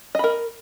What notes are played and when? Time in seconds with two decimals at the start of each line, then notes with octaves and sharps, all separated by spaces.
0.15 D#5
0.19 B5
0.24 A#4